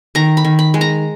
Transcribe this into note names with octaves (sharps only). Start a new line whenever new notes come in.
D#3 A#5
B5
D#3
B5
G#3
A#5